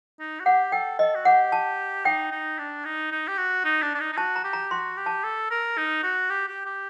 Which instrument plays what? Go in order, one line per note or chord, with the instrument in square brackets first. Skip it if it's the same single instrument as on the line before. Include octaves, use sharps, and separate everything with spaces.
[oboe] D#4
F#4
[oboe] G4 [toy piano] F#5
[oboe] A4 [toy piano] G5
[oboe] A4 [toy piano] D#5
[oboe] F#4
[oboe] G4 [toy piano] F#5
[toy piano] A5
[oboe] D#4 [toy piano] G5
[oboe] D#4
D4
D#4
D#4
G4
F#4
D#4
D4
D4
D#4
D#4
[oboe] F#4 [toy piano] A5
[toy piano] A#5
[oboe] G4
[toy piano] A#5
[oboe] F#4 [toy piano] C6
[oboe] G4
[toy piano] A5
[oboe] A4
A#4
D#4
F#4
G4
G4
G4